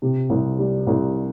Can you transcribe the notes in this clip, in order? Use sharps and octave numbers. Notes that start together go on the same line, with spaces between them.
C3
C2
G3
C2